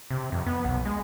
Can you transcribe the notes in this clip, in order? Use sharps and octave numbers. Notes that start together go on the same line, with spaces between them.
C3
F2
B3
B1
G#3